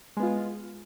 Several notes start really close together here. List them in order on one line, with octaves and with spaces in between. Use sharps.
G#3 B3 F4